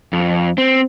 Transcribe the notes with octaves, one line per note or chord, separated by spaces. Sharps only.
F2
C4